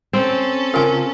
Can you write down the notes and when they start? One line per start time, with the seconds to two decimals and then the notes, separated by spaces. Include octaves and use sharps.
0.13 C4 C#4 A4
0.74 C#3 F4 A#4 F5 G#5